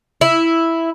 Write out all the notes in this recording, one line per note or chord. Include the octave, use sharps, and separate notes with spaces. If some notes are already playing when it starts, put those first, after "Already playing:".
E4